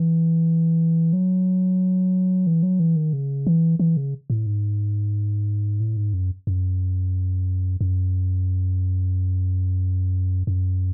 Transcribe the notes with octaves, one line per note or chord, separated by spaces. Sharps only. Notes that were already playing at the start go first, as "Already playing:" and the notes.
Already playing: E3
F#3
E3
F#3
E3
D#3
C#3
E3
E3
C#3
A2
G#2
A2
G#2
F#2
F#2
F#2
F#2